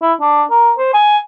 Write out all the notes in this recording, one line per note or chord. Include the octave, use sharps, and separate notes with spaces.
E4
D4
A#4
C5
G#5